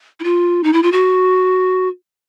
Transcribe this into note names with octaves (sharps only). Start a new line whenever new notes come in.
E4
F4
D#4
E4
F4
F#4